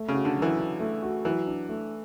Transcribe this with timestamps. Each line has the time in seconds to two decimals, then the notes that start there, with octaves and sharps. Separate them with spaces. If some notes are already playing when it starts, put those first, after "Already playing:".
Already playing: A3
0.08 C#3
0.14 F#4
0.25 D3
0.36 F#3
0.42 E3
0.59 D4
0.80 A3
1.03 F#4
1.25 E3 F#3
1.47 D4
1.69 A3